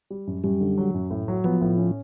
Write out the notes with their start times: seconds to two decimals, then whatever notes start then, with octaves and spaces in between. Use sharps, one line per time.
0.10 G3
0.27 F#2
0.44 F#2 G3
0.61 D3
0.78 F#3
0.94 F#2
1.11 A2
1.28 F#3
1.44 F3 B3
1.62 A2
1.78 C#4